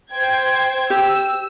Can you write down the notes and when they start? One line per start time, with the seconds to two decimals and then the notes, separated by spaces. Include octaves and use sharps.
0.12 C5 G5 G#6
0.90 G4 E6